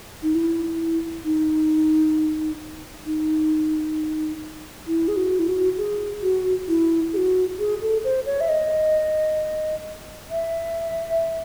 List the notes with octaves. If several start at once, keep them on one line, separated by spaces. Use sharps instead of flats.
D#4
E4
D#4
D#4
E4
G#4
F#4
E4
F#4
G#4
F#4
E4
G#4
F#4
G#4
A4
C5
C#5
E5
D#5
E5